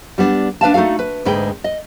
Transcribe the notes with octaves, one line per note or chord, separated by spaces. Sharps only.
G3 B3 D4
D4 B4 F5 A5
A3 D#4 F#4 A4 F5
B4
D2 G#2 G#3 B4 G5
D#5